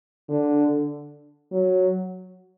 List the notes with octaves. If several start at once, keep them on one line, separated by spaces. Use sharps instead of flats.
D3
F#3